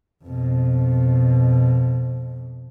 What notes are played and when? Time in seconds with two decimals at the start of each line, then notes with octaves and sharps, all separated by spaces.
0.24 F2 B2